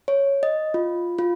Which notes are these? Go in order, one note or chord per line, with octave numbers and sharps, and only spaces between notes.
C#5
D#5
F4
F4